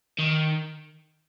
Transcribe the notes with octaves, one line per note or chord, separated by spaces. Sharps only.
D#3